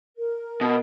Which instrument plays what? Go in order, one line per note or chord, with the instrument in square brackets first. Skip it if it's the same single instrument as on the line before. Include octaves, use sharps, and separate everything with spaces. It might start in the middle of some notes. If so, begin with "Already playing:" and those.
[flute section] A#4
[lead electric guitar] B2